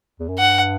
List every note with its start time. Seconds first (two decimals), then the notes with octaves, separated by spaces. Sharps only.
0.20 E2
0.29 F#2
0.38 G2 F#5